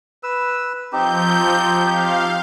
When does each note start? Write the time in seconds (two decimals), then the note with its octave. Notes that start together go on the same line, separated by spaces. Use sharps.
0.23 B4 E6
0.93 F3 C4 D#4 G4 G6
1.90 F5